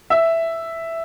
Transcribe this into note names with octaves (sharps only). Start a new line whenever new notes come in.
E5